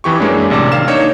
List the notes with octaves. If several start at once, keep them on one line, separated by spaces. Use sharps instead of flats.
F2 E3 G4 C#6
F#2 G#3 A#3 C#4 D4
A1 C3 D5 A5 D6
D#3 F5 F6 E7
A#3 D4 D#4 C#5